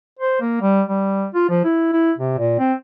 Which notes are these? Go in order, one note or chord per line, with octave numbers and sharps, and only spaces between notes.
C5
A#3
G3
G3
F4
F3
E4
E4
C3
A#2
C4